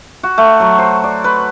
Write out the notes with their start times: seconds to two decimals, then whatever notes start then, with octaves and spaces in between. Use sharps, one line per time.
0.23 F#4
0.38 A3
0.60 F#3
0.78 C5
1.04 D5
1.24 B4